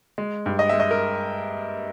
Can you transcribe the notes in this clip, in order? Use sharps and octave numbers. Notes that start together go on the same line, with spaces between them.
G#3
G2
D#5
G#3 E5
D#5
A#4